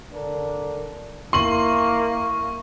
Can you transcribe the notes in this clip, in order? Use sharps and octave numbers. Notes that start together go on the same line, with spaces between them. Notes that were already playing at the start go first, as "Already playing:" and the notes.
D3 D4 A#4
A#3 E4 C6 C#6 F#7